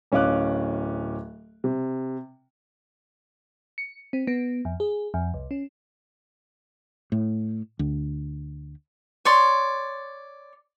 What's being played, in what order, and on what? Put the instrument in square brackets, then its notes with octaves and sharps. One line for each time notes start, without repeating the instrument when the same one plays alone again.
[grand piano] D1 C#4 D#5 F5 D6 F#6
C3
[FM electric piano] C#7
C4
B3
F2
G#4
F2
C2
C#4
[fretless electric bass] A2
D2
[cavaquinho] C#5 D5 C6